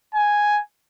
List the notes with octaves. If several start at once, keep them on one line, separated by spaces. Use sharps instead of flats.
G#5